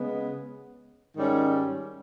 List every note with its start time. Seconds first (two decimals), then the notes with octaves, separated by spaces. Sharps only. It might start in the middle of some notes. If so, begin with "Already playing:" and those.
Already playing: C#3 G#3 B3
1.16 G#2 D#3 G3 C#4